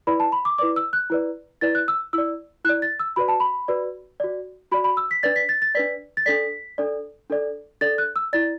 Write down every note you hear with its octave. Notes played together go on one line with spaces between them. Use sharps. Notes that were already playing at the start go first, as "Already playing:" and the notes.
E4 B4 D5 B5
A5
B5
D6
E4 B4 D5 D6
E6
F#6
E4 B4 D5
E4 B4 D5 A6
F#6
E6
E4 D5 E6
E4 D5 F#6
A6
E6
F#4 B4 D5 B5
A5
B5
F#4 B4 D5
F#4 D5
F#4 D5 B5
B5
E6
B6
D4 B4 D5 A6
B6
A6
A6
D4 B4 D5 B6
A6
D4 A4 D5 B6
D4 A4 D5
D4 A4 D5
D4 A4 D5 A6
F#6
E6
E4 D5 A6